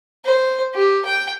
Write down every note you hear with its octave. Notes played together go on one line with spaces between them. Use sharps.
C5
G4
G5